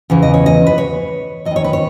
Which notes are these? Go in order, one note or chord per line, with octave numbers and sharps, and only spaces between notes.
E2 C#3 E3
D#5
C#5
D#5
B4
C#5
E2 D#5
D#3
C#5
B4
C#5